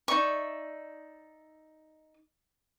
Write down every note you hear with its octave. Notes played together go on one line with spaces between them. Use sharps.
D#4 D5 E5 C#6